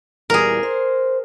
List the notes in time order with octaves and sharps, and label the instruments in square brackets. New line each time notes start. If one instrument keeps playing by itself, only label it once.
[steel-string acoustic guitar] E2 A#2 G3 [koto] G#4 A#4
[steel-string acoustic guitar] C5